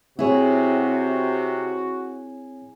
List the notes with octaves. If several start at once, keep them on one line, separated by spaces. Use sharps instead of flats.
C3 C4 E4 F#4 G#4 C#5